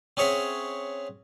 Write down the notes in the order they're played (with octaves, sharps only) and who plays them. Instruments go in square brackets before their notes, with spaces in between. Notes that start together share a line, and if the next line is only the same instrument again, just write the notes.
[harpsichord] C4 C#4 G#4 C#5 E5 F#5